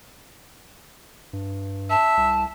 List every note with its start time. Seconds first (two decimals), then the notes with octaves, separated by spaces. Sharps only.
1.33 G2
1.90 E5 A5
2.17 C2